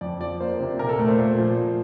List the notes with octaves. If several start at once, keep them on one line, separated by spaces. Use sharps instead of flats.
F2 D5
F3 D5
A#3 C5
C3
A#2 A#4
A4
A3 A#4
C5
A#2
F3
A#2